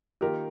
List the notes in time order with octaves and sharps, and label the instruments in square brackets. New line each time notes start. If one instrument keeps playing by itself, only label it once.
[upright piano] D#3 A#3 F4 G4 A#4